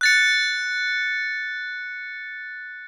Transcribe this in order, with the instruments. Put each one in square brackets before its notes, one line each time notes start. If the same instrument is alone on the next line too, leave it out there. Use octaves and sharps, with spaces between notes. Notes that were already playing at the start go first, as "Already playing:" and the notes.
[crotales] F#6 A6 C#7